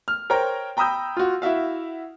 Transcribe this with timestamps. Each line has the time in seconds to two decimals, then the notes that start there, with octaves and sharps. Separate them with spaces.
0.08 F6
0.30 A#4 C5 C#5 G5 A#5
0.77 G5 A#5 B5 D#6 E6 G6
1.17 F4 F#4
1.42 E4 F#4 E5 F5